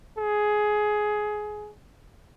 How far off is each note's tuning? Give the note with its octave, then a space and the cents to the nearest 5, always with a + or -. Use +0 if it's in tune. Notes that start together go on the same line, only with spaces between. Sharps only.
G#4 +15